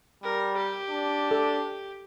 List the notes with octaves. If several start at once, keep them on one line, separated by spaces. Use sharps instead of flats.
G3 A#4
G4
D4
A4